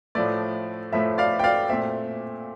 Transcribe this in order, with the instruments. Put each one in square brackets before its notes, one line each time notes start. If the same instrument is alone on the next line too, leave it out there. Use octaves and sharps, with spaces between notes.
[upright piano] A2 F3 A3 D5
A2 F3 A3 E5
D5 F5
G5
D5 F5
A#2 A3 C4 E5